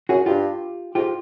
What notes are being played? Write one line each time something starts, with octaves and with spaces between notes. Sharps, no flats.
F#2 F#4 G#4
G2 F4 G4
G#2 F4 G4